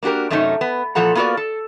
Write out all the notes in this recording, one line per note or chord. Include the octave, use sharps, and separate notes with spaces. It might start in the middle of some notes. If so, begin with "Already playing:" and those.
A#3 D4 F#4 G4 A#4
F#2 C3 A3 C#4 D#4
B3
A#2 E3 F3 A4 F#5 A#5
A#3 B3 F4 F#4 A#4 D5
A4